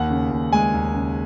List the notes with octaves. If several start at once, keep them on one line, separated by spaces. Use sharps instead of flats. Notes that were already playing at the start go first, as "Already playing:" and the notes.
Already playing: D#2 F#5
C#3
D#2
G#3 G#5
D#2
C#3